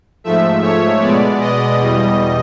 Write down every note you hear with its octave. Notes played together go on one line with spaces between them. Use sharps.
G#2 F3 A3 E5
C#5
B2 G#3 B3 D5
D#5
E2 B2 G3